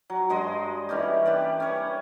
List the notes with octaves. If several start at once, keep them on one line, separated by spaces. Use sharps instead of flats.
F#3
G2 G#3 D#5 C6
E3 G3 C#4 G4
G4 B4 D5
C#4 C#5